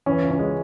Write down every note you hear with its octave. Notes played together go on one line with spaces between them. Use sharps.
E3 C#4
C#2
C#4
G#3